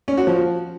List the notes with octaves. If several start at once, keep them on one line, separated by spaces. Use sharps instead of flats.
C#4
F#4
F3